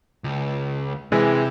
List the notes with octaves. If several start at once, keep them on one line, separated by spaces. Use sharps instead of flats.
C#2
C3 E3 G#3